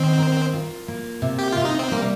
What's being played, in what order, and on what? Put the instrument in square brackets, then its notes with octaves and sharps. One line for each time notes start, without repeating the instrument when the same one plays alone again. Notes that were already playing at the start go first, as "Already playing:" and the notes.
Already playing: [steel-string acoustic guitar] D#3 [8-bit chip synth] C4
[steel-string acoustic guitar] A#4
F4
A#3
C3
[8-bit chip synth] G4
[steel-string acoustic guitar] C3 [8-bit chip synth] F4
[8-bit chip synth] D#4
C4
[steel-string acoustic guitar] G3 [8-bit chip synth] A#3